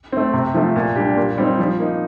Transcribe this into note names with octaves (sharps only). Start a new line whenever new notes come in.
A3 C4
C3
F3 A3
A#2
G3 D4 G4
A#2
G3 C4 D#4
F3
A#3 D#4